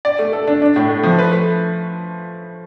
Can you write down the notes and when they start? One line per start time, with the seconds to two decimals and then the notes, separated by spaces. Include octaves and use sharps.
0.05 D5
0.19 A3
0.33 A4
0.47 D4
0.62 D4
0.76 A2
0.89 A3
1.03 F3
1.19 B4
1.32 A3